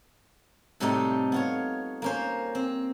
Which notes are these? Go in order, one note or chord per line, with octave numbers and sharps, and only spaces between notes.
A2 C3 G3 A3 D#4 G4
B3 F4 C#5
A#3 C#4 C5
C4